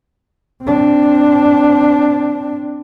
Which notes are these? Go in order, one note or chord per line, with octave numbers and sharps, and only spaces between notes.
C4 D4